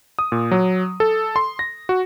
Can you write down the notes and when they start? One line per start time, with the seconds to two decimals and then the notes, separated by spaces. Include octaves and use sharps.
0.19 D#6
0.32 A#2
0.51 F#3
1.00 A4
1.36 C6
1.59 A#6
1.89 F#4